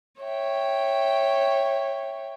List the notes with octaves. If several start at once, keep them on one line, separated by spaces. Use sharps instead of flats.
C#5 E5 G5